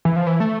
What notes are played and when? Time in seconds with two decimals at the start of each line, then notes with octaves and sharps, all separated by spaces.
0.05 E3
0.16 F3
0.27 E3
0.40 A3